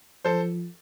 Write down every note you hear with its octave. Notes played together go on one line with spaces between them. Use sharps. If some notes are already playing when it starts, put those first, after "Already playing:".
F3 A4 C5